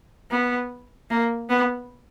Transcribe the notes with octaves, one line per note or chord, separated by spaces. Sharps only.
B3
A#3
B3